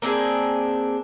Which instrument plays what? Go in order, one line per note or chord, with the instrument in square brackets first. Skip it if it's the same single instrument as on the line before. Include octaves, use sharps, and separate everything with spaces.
[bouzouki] A#3 C4 D4 G#4